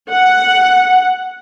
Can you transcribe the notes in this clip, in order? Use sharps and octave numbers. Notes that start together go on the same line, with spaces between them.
F#5